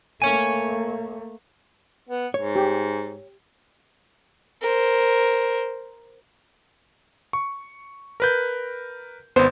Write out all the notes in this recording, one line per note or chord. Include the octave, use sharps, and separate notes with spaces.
A3 A#3 C#5 G#5
B3
G#2 C#5
G4
A#4 C5
C#6
A#4 B4 G6
G#1 B3 C5